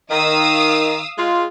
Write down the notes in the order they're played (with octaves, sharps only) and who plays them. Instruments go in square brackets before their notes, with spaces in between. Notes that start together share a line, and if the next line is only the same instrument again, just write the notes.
[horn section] D#3 [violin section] F5 D#6 E6
[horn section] G#3 F4